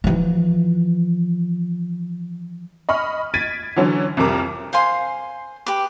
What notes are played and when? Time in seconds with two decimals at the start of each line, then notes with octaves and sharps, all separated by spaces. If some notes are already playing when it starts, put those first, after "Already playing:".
0.04 E3 F3
2.89 D#5 B5 C#6 F6
3.34 G#6 A6 B6 D7 D#7
3.76 D3 E3 F#3 C#4
4.17 C2 F2 C3 A#4 D6
4.73 C5 F5 G#5 C6
5.66 G4 B4 D6